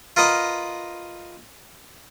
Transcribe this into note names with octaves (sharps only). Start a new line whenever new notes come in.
F4 A#4 B4 D#5 F#5